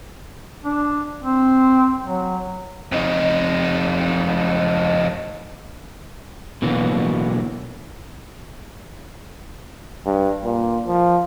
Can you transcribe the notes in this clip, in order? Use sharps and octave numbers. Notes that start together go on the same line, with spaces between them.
D4
C4
F#3
F2 D#4
B2 D3 E3 F#3 A#3 B3
G2
A#2
F3